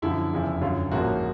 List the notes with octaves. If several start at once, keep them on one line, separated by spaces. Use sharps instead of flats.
F#2 D3 F3 E4
F1 E2 C#3 F3
F#2 D3 F#3 F4
A1 G#2 F3 A#3 C#4 F#4